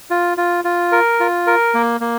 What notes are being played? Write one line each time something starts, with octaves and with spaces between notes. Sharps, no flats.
F4
F4
F4
A#4
F4
A#4
A#3
A#3